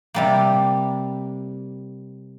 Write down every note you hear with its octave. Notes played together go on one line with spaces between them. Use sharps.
C3 G3 A#3